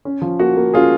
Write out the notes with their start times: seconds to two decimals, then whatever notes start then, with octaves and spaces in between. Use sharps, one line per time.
0.05 C#4
0.22 F3
0.39 A#3 F#4
0.56 A#3
0.74 C#4 F4 G#4